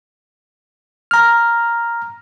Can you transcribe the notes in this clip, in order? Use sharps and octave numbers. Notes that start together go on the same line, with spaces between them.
A#5 F6